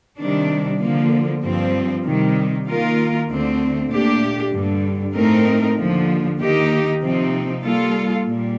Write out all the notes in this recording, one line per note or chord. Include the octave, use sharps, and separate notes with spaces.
C3 D#3 G3 D4
D3 F3 A#3
G2 F3 C4
C3 D#3 G3
D#3 A#3 F4 A#4
D2 D3 A3 C4
A#2 A3 D4 G4
G2 D3 G3
A2 A3 C4 D#4 A#4
D#2 D3 F3
D#2 D#3 A#3 D#4 G4
C3 F3 C4 D#4
G3 A#3 F4 A4
A#2 G3